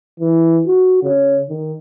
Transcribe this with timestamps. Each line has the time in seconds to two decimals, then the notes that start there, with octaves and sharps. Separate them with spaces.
0.20 E3
0.67 F#4
1.03 C#3
1.49 D#3